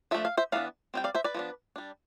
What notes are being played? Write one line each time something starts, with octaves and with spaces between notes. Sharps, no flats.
F3 A3 D4 E5
F5
C5 E5
E3 B3 D4 D5 F5
G3 C4 G5
D5 F5
C5 E5
B4 D5
F3 B3 D4
G3 D4